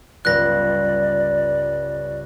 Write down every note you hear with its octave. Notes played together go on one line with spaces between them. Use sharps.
G1 C#2 D5 F#6 A#6